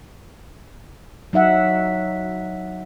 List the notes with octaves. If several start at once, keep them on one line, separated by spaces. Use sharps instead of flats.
F#3 D#4 E5 F#5